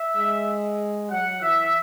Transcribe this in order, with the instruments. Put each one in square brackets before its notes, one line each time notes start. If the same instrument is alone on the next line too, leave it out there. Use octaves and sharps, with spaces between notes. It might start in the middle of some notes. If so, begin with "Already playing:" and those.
Already playing: [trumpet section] E5
[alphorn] G#3
[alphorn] F#3 [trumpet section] F#5
[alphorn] E3 [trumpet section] E5